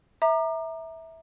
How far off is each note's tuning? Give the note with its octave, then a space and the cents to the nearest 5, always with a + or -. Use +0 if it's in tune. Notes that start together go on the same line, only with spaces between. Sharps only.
E5 -15 A#5 +0 D6 +40